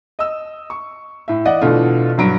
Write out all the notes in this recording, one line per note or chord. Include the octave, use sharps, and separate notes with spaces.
D#5 E6
C#6
A2 E5
E3 D5 D#5 F#5
B2 D3 E3 A3 F4
G2 F#3 D7